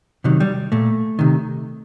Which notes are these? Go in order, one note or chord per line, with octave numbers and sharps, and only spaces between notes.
C3 D#3 F#3
G3
A#2 A3
C3 D#3